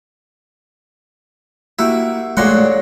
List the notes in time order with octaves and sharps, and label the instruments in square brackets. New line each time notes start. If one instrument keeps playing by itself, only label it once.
[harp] A#3 F#4 G4 [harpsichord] E4
[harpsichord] A#1 A#2 F#5 [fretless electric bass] G#3 A3 [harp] C#5 D5 C6